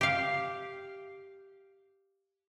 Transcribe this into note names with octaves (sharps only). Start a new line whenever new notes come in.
G4 F5